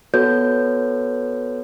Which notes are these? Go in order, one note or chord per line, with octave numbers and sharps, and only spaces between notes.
B3 F#4 A4 B4 C#5 G6